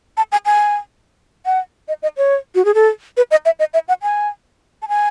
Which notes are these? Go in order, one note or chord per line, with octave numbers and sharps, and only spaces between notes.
A5
G#5
G#5
F#5
D#5
D#5
C#5
F#4
G#4
A4
B4
D#5
E5
D#5
E5
F#5
G#5
A5
G#5